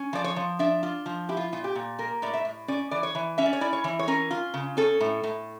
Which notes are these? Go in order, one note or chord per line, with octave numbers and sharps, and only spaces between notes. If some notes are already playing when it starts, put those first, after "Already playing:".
Already playing: C#4
F3 D5
C#5
F3
D4 E5
F4
F3
E4 G4
F4
A#2 F4
G4
A#2
A#3 A#4
A2 D5
E5
A2
C#4 D5
E3 D5
C#5
E3
C#4 E5
D5
C#5
E4 D5
C#5
E3
C#5
C#4 A#4
F4
C#3
C#4 A4
A2
A2